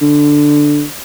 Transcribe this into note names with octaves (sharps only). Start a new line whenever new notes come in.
D3